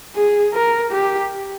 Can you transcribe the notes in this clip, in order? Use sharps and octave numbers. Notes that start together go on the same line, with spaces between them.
G#4
A#4
G4